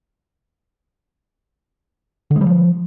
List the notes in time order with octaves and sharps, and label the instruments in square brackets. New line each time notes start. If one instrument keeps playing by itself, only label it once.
[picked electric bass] D3
G#3
G3
F3